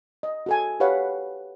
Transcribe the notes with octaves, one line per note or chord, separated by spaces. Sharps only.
D#5
F#4 A4 G#5
G4 B4 C#5 F5 F#5